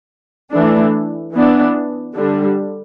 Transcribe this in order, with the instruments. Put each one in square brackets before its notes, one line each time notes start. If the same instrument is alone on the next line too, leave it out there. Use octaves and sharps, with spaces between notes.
[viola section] E3 A3 D4
E3 B3 D4
D3 G3 D4